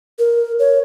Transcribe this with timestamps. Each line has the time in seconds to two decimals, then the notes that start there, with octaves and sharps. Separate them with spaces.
0.19 A#4
0.59 C#5